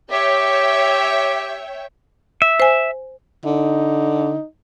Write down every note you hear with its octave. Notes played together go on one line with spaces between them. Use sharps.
G4 C#5 E5 G5
E5
C5 G#5
D3 D#4